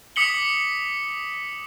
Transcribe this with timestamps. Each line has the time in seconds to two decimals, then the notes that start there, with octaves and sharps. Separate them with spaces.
0.16 D6 D#6 B6 C#7 F#7 G7